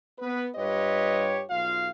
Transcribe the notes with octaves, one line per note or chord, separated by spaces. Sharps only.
B3 B4
G2 F4 G4 B4 C#5 D#5
B1 F4 F5